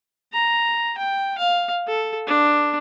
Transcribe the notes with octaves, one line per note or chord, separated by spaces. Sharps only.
A#5
G5
F5
A4
D4